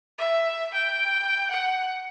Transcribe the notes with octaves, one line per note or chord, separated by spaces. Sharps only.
E5
G5
F#5